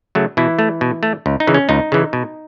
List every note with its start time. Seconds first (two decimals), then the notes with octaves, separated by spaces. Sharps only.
0.15 C#3 F#3 A3
0.37 B2 E3 E4
0.59 A3
0.81 B2
1.03 A3
1.26 C#2
1.40 D#4
1.47 C#3 E3
1.54 C#4
1.69 C#2 D#4
1.92 C#3 E3
2.13 B2